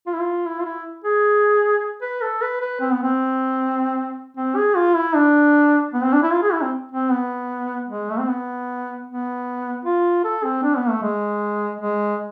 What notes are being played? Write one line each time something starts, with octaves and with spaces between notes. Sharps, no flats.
F4
E4
F4
E4
F4
E4
G#4
B4
A4
B4
B4
C4
B3
C4
C4
G#4
F4
E4
D4
B3
C4
D4
E4
F4
G#4
E4
C4
C4
B3
G#3
A3
C4
B3
B3
F4
A4
C4
D4
B3
A3
G#3
G#3